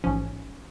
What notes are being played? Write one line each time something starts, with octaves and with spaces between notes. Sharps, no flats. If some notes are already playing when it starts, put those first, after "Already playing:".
A1 G#2 F3 C#4